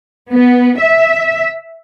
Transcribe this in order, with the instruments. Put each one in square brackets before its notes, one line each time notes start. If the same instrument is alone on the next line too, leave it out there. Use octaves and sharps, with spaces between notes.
[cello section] B3
E5